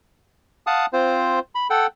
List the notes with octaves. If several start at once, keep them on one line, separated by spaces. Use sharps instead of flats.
F5 F#5 A5 D#6
C4 F4 C5
B5
A4 F#5 G5